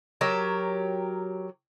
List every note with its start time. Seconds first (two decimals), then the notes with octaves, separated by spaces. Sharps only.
0.21 F#3 G4 A#4